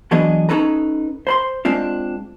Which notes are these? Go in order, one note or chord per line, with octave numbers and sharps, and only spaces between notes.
E3 F#3 B3 D4 G#4 D#5
C#4 D#4 A4 B4 A#5
C5 B5 C6
G#3 C4 D4 F4